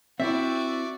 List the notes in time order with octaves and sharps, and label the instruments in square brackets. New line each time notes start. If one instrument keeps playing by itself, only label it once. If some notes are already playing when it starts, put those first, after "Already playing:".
[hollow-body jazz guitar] C4 E4 [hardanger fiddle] F#4 D5 [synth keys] E5